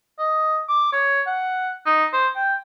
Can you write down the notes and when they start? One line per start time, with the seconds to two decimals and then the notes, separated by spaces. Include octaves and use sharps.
0.19 D#5
0.69 D6
0.93 C#5
1.27 F#5
1.86 D#4
2.13 C5
2.36 G5